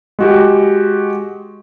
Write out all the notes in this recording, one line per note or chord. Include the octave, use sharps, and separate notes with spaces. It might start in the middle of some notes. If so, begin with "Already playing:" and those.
G#3 F#4 G4